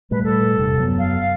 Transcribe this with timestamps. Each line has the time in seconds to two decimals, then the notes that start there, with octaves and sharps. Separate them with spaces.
0.11 A#2 G3 A3 B4
0.24 A4
0.57 E1 G2 C3
0.79 F#2 F#3 B3
0.99 F5